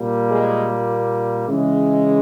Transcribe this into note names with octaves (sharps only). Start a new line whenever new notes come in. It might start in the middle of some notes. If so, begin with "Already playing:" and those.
Already playing: A#2 G3 A#3
G#3 G#4
C#3 E3 G#3